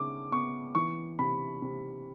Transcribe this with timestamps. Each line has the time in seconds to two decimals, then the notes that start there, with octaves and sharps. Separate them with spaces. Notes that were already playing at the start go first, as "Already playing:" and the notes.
Already playing: C#3 B3 D6
0.32 B3 C#6
0.75 E3 C#6
1.19 C3 B5
1.62 C3